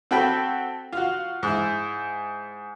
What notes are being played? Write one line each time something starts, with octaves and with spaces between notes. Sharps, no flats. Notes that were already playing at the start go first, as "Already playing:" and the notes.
C4 F#4 A4 G5 B5
F4 F#4
G#2 E4